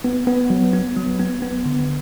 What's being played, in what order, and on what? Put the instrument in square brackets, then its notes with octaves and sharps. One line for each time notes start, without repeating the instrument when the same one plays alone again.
[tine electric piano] B3
B3
F#3
B3
F#3
B3
B3
D3